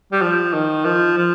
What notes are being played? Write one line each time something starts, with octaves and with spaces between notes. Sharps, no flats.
G3
F3
D#3
F3
F3